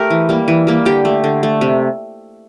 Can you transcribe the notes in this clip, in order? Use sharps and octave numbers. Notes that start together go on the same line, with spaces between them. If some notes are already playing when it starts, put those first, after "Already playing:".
Already playing: A3 G4 A#4
E3
G3 A#3
E3
G3 A#3
D3 G4
A3
D3
A3
C3